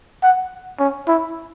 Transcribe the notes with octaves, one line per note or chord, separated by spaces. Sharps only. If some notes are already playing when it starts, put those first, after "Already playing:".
F#5
C#4
E4